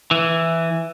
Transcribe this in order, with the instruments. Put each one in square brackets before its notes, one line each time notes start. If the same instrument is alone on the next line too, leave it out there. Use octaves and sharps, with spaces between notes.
[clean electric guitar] E3